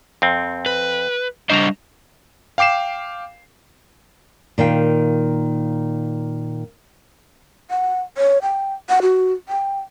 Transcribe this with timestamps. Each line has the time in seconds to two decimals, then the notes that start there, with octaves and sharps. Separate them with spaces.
0.22 F2 C4
0.66 B4
1.50 G3 D4 C5 D#5 A#5
2.58 F5 G5 D6 C7 E7
4.58 A#2 D#3 F5 G5
7.70 F#5
8.18 C#5
8.42 G5
8.89 F#5
9.02 F#4
9.49 G5